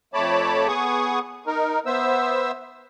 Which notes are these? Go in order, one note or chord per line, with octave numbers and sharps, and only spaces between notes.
F2 A3 C#5 A5 B5 D6
B3 G#4 C#6 D#6
D#4 A#4
B3 C5 E5 E6